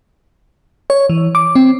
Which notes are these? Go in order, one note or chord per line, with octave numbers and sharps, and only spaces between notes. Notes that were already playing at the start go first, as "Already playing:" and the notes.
C#5
E3
D6
C4